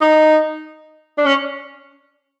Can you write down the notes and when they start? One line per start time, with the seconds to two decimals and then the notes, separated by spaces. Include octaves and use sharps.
0.01 D#4
1.18 D4
1.25 C#4